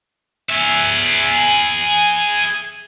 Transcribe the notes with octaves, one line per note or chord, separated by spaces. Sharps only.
G#4 E5